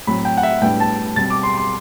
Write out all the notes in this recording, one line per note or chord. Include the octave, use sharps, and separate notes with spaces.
A2 F#3 C4 B5
G5
F#5
E5
A2 G3 B3 D4 G5
A5
B2 G3 C4 A6
D6
C6
C6